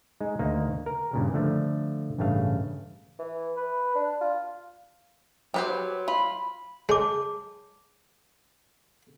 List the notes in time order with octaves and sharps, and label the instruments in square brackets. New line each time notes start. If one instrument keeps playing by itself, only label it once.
[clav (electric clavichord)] G#3 D#4
D2 D#3 A#3 D#4
A#4
G2 A#2 C#3
D3 F3 A3
A1 G2 C#3 A3 F5
[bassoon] E3
B4
D4
F4
[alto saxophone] F#3 [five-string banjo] G4 B4 C5
[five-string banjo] F4 [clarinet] B5
[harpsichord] G#3 [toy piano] C#5 A5 D6